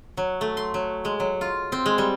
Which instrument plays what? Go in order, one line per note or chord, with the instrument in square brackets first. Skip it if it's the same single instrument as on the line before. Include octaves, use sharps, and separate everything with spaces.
[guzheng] F#3
A3
C6
F#3
G#3
F#3
F4
C4
G#3
G3